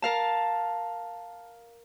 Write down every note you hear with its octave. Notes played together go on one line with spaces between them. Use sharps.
A#4 F5 A5